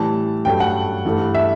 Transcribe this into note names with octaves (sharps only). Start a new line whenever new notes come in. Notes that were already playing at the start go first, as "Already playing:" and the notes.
Already playing: A2 E3 G3 A5
G2 F#3 A3 G5
F#5
G2 E3 A3
E5